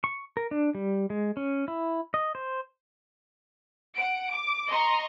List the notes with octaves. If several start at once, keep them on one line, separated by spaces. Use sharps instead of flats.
C#6
A#4
D4
G3
G#3
C#4
E4
D#5
C5
F#5 D7
D6
D#5 A#5 C6 C#6